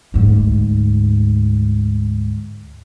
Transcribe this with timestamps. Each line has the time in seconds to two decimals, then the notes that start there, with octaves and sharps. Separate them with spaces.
0.14 D2 G#2